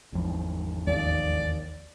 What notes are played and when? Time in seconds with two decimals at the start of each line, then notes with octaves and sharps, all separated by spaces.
0.12 G#1 E2 F3
0.87 D#2 D5